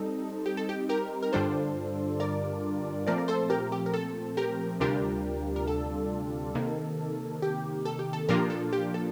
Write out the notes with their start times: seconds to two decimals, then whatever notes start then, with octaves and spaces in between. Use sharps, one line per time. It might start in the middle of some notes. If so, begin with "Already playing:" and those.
Already playing: G3 C4 D#4 A4
0.46 G4
0.57 A4
0.69 G4
0.89 G4 A#4
1.22 A#4
1.33 G2 D3 G3 D4 F4 A4 C5
2.20 A#4 D5
3.07 A#2 F3 A3 C4 A#4 D5
3.18 A#4
3.28 A4 C5
3.50 G4 A#4
3.72 G4
3.86 A#4
3.94 A4
4.37 G4 A#4
4.80 D2 C3 G3 D4 F4 G4 A#4
5.56 A#4
5.67 A4
6.55 C3 D#3 A#3
7.42 G4
7.85 A4
7.99 G4
8.13 A4
8.29 A#2 F3 A#3 D4 F4 G4 A#4
8.50 A4
8.73 G4
8.94 A4